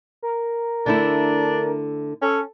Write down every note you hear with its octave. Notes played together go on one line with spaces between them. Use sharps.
A#4
D3 A3 D4 E4
C#4 A4